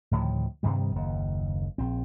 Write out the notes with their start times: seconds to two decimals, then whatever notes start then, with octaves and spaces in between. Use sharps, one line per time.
0.11 D2 A2 D#3 F3
0.63 G2 C3 D#3 G3
0.96 F#1 D#2
1.78 A#1 C4